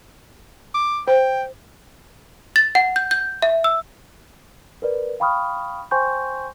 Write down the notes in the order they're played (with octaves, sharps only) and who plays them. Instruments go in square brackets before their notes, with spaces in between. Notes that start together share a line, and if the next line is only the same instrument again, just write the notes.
[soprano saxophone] D6
[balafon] C5 [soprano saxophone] G5
[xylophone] A6
F#5
G6
G6
E5
E6
[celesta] A#4 B4 D5
F5 G5 B5 C#6 D#6 F6
C5 G5 G#5 C6 C#6 G6